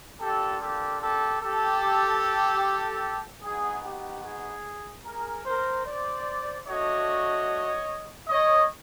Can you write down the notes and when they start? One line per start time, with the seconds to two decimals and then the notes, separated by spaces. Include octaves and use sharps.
0.20 A#3 D4 F4 G4 A4
0.61 G4 A4
1.01 G4 A4
1.41 G4 A4
3.43 B3 D#4 F#4 G#4
3.84 G4
4.24 G#4
5.05 G#4 A#4
5.46 A#4 C5
5.86 C5 D5
6.66 A3 D4 F#4 C#5 D#5
8.28 C#5 D#5